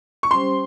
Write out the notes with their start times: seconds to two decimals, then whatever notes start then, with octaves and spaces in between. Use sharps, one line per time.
0.23 C#6
0.31 G3 C#4 G4 C5 C6